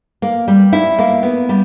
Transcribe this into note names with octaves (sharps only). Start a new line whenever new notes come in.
A#3
G3
E4
A#3
B3
G3